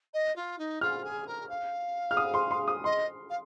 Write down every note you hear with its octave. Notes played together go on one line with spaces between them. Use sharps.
D#5
F4
D#4
F4 F6
G#4
A#4
F5
F6
D#6
C6
C6
D#6
D#5 C6
F5